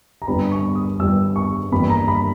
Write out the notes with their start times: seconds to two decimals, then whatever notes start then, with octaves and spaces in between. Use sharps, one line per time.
0.22 A#5
0.27 G1 G2 G3 B3 B5
0.52 C#6
0.75 D#6
0.99 G1 G2 G3 B3 E6
1.36 C#6
1.72 G1 G2 E3 G3 A#3 B5
1.90 A#5
2.08 B5